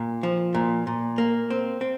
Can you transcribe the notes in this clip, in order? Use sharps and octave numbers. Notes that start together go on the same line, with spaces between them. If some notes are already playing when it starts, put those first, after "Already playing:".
Already playing: A#2
F3
A#2
A#2
A#3
C4
C4